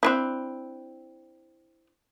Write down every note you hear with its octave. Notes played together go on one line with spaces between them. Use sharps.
C4 D4 E4